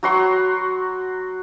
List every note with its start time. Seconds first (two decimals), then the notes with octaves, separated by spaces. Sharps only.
0.03 F#3 F#4 C6 C#6